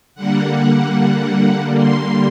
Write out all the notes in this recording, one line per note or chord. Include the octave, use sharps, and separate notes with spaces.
D3 G3 A#3 F#5
C6